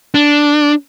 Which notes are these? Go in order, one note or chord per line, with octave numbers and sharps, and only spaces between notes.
D4